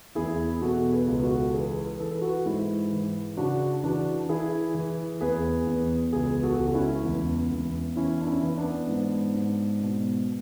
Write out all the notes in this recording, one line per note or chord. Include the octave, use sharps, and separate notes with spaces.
E2 E4 G#4
B2 F#4 A4
G#4 B4
C#2
F#4 A4
E3 G#4 B4
E3 A4
B4
F#4 A4
G#2 E4 G#4
E3
C#3 D4 F#4
E3 D4 F#4
E3 E4 G#4
E3
E2 G#4 B4
E2
C#2 G#4 B4
F#4 A4
C#2
F#4
C#4 E4
E2
E2
E3 C#4 E4
D4
C#4 E4
E3 E4
B3 D4
G#2
G#2
B2